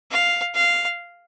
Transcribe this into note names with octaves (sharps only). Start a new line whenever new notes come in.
F5
F5